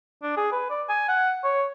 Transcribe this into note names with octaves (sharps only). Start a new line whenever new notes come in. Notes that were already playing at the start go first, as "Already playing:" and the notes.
D4
G#4
B4
D5
G#5
F#5
C#5